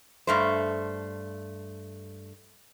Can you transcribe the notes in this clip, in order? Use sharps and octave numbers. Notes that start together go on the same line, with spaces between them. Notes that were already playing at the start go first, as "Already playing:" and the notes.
G2 A3 C5